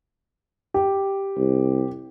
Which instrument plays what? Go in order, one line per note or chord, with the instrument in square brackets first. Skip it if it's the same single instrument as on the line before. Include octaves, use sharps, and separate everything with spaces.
[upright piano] G4
[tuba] C2